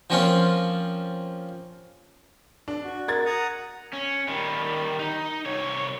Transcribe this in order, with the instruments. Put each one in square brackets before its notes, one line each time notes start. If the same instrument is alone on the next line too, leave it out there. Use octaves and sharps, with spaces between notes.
[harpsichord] F3 A#3 C4 C#4 F4
[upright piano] D4
[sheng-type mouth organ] F#4
[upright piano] A#4 G#6 A6
[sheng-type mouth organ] F#5 A#5 D#6
[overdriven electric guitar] C#4
D#3 G3
D#4
C2 C#5